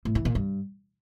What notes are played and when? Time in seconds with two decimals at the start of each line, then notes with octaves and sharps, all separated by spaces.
0.05 A2
0.15 E3
0.25 A#2
0.35 G2